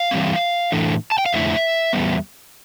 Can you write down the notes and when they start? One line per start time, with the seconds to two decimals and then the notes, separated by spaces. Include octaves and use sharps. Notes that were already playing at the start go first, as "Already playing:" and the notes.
Already playing: F5
0.11 E3 G3 C4
0.72 A2 E3 A3 D4
1.12 A5
1.18 G5
1.26 F5
1.33 F2 D3 A3 E4 E5
1.93 E2 C3 G3 B3